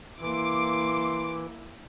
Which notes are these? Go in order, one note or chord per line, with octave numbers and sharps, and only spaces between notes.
E3 A#3 E4 C6 D6